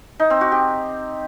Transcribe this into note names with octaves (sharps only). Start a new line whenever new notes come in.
D#4
C4
F#4
G4